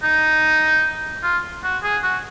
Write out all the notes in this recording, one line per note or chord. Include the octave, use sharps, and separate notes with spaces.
D#4
F4
F#4
G#4
F#4